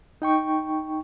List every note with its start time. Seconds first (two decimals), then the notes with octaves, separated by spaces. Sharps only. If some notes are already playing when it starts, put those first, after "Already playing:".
0.22 D#4 G5 C#6